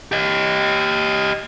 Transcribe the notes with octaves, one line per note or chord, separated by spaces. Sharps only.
G4 D#5